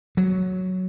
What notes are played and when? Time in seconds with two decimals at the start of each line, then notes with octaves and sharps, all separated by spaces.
0.17 F#3